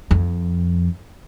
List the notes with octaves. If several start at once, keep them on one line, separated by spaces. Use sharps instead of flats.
F2